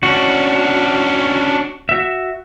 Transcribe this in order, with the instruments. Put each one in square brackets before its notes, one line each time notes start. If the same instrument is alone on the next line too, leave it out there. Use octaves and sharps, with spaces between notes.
[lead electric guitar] C#4 D4 [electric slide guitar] F#4
[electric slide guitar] F#4 E5